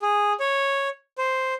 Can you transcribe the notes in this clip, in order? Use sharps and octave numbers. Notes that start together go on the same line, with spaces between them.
G#4
C#5
C5